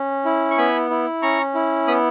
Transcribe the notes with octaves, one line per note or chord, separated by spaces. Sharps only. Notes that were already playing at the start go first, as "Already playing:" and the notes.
Already playing: C#4
E4
C#6
B3 G#5 B5
E4
C#4 A#5 C#6
E4
B3 B5 D#6